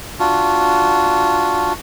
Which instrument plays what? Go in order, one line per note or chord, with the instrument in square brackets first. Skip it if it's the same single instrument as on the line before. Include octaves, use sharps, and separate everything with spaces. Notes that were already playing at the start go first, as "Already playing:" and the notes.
[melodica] D4 F4 F#4